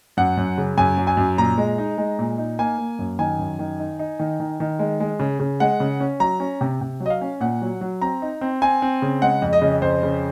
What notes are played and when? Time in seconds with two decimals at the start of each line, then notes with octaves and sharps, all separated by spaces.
0.17 F#2 F#5
0.37 F#2
0.58 C#3
0.78 F#2 G#5
0.98 F#3
1.07 G#5
1.17 F#2
1.38 A#2 A#5
1.58 G#3
1.78 D#4
1.98 G#3
2.19 A#2
2.38 D#4
2.59 A#3 G#5
2.78 A#3
2.99 F#2
3.19 D#3 G#5
3.39 F#2
3.59 D#3
3.79 D#4
3.99 D#4
4.19 D#3
4.40 D#3
4.60 D#3
4.79 G#3
5.00 G#3
5.20 C#3
5.40 C#3
5.60 G#3 F#5
5.80 C#3
6.00 C#4
6.20 F#3 A#5
6.40 C#4
6.61 C3
6.81 C3
7.00 F#3
7.06 D#5
7.10 F5
7.21 C#4
7.40 A#2 F#5
7.62 F#3
7.81 F#3
8.01 C4 A#5
8.22 D#4
8.41 C4
8.62 C4 G#5
8.82 C4
9.02 C#3
9.22 G#3 F#5
9.42 F2
9.53 D#5
9.62 C#3
9.82 F2 C5
10.03 C#3